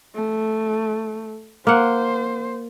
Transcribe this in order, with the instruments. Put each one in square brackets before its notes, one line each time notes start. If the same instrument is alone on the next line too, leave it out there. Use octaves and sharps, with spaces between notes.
[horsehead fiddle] A3
[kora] A#3 F#5 [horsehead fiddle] C5